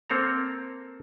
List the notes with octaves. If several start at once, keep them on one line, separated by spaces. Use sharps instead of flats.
A#3 C4 A4 A#5